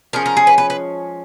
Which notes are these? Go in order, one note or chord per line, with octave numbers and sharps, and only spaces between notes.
F3 G#3 C#4 A#4
A#4
G#4
B4
B4
B4